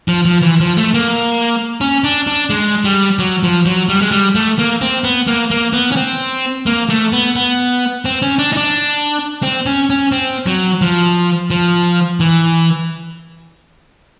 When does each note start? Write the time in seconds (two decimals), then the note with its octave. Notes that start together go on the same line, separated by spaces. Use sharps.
0.08 F3
0.25 F3
0.42 E3
0.60 F3
0.77 A3
0.94 A#3
1.81 C#4
2.04 D4
2.27 D4
2.50 G#3
2.85 G3
3.19 F#3
3.43 F3
3.66 F#3
3.89 G3
4.01 G#3
4.11 G3
4.35 A3
4.59 A#3
4.81 C4
5.04 B3
5.27 A#3
5.51 A#3
5.73 B3
5.92 C#4
5.96 C4
6.66 A#3
6.89 A3
7.13 B3
7.36 B3
8.05 C4
8.22 C#4
8.38 D4
8.53 D#4
8.57 D4
9.43 C4
9.66 C#4
9.90 C#4
10.12 C4
10.46 F#3
10.81 F3
11.50 F3
12.20 E3